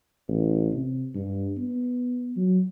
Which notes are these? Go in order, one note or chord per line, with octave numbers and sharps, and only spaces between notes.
A1
C3
G2
B3
F#3